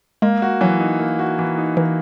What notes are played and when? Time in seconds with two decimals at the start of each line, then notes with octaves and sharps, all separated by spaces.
0.22 G#3 A#3
0.42 F#4
0.61 E3 F#3
0.80 D#4
1.00 A#3
1.19 F#4
1.39 E3
1.58 D#4
1.77 E3 A#3